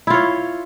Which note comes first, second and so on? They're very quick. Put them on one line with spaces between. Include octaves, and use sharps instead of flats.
E4 F4 C#5